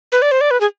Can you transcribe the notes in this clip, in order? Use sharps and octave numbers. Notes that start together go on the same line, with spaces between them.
B4
D5
C5
D5
B4
G#4